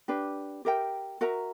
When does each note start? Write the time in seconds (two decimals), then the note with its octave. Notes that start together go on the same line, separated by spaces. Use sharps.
0.08 D4 G4 B4
0.65 G4 A#4 E5 G5
1.21 F#4 A#4 E5 A#5